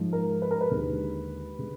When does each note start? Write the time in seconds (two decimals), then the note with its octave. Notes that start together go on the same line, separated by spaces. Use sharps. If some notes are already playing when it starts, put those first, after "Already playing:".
Already playing: G#2 F3 G#3
0.13 A#4
0.42 B4
0.51 A#4
0.61 B4
0.71 D#2 D3 G#3
1.59 D3 G#3